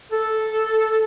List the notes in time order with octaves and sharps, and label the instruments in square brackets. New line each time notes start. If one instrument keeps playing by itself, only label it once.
[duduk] A4